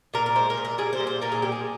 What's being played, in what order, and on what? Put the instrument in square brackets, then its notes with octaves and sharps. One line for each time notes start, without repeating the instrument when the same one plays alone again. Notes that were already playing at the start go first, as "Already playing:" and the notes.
[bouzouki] A#2 A#4
A#4
G#3 C5
A#4
A#2
A#4
G3 G#4
C5
A#2
C5
A#2 A#4
G#4
G3 G4
G#4